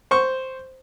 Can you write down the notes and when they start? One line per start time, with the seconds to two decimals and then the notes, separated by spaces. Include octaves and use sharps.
0.11 C5 C#6